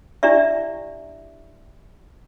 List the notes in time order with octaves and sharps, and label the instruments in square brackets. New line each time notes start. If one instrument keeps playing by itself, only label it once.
[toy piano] D4 E4 G4 D5 E5